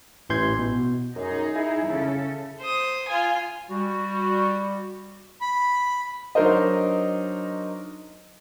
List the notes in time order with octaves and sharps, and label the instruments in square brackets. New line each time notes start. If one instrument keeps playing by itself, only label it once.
[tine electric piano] A1 E3 C6 G6 G#6
B2
[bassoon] F#2 [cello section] D#4 G#4
[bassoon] E4
[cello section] C#3 A4
[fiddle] C5 D#6
F4 G#5
[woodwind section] G3 F#4
[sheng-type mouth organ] B5
[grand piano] F#3 D4 D#4 A#4 C5 D#5